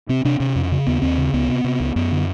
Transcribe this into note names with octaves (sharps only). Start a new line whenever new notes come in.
C3 C4
C3 D4
C3 C#4
F2
C#3
D#2 B3
D#2 C4
C#3
C#2 B3
C3
C3
C#2
F#2 B3
D3